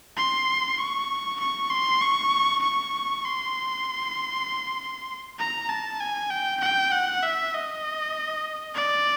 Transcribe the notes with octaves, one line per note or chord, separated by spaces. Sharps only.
C6
C#6
C#6
C6
C#6
C#6
C6
A#5
A5
G#5
G5
G5
F#5
E5
D#5
D5